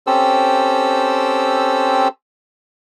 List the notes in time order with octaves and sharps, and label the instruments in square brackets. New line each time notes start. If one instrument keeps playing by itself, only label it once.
[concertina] C4 C#4 G4 A4 C5 E6